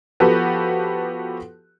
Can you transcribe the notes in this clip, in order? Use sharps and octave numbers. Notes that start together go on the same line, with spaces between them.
F3 B3 F#4 G4 A4 B4